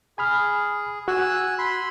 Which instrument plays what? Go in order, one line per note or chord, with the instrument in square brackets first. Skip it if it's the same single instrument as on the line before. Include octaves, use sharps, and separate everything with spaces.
[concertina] G#4 [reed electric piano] G#5 B5 F6
[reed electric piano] F#4 [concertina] G#5 E6 F#6
[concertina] B5 C6